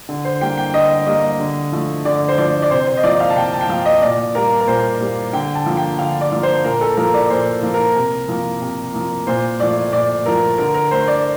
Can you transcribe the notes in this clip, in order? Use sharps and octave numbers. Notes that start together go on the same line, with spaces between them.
D3
C5
G3 A#3 G5
G5
D3 D#5
G3 A#3 D#5
D3
F3 A3
D3 D5
C5
F3 A3 D5
D5
C3 C5
C5
D#5
F3 A#3 D5
F5
A5
C3 G5
A5
G5
F3 A#3 F5
D#5
A#2 D5
G3 A#3 A#4
A#4
A#2 C5
G3 A#3
D3 G5
A5
F3 A#3
G5
D3 F5
D5
F3 A#3
C5
A#2 A#4
A4
F3 A#3 A#4
D5
A#2 C5
F3 A#3
A#4
C3
F3 A#3
C3
F3 A#3
A#2 C5
F3 A3 D5
A#2 D5
F3 A3 A#4
D3 A#4
A#4
A3 C5
D5